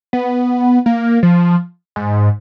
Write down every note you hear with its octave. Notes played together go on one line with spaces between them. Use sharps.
B3
A#3
F3
G#2